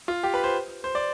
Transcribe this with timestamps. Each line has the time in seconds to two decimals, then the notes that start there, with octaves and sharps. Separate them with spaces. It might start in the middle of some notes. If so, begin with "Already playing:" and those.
0.08 F4
0.23 G4
0.34 B4
0.44 C5
0.84 C5
0.95 D5